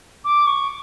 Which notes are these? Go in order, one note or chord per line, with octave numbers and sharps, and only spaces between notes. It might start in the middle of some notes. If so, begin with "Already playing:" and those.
D6
C#6